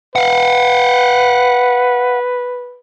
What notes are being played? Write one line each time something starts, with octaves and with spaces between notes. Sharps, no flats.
B4 F5 F#5